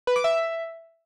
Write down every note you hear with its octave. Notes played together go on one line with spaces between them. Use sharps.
B4
D6
E5